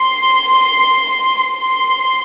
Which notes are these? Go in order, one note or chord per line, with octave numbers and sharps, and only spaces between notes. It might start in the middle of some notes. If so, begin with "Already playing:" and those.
Already playing: C6
C6